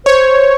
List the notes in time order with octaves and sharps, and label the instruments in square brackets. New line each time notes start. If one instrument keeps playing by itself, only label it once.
[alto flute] C5 [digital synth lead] C#5